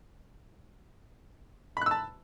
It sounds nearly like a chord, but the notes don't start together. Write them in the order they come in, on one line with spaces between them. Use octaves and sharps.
B5 F#6 E6 A5